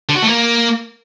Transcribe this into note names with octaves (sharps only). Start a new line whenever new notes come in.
D3
F#4
A3
A#3